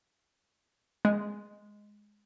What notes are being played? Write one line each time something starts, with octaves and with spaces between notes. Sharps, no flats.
G#3